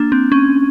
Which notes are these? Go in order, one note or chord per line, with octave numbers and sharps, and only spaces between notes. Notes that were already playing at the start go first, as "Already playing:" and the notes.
Already playing: A#3 D4
C4
C#4